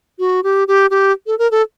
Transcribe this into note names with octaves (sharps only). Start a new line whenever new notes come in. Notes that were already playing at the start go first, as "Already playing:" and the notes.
F#4
G4
G4
G4
A4
A#4
A4